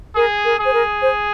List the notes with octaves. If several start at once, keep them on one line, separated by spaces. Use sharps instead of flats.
G#4 A#4
A#4
G#4
C5
A#4
C5